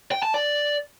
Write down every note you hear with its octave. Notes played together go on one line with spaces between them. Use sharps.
G5
A5
D5